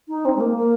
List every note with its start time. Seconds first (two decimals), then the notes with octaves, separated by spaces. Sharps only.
0.09 D#4
0.25 C4
0.36 G#3
0.40 A#3
0.56 A#3